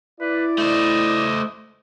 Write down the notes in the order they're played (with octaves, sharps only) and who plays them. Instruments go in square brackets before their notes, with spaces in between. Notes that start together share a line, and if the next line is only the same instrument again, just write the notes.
[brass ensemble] E4 D5 [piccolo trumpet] B4
[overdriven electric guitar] A3 C5 [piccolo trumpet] D#5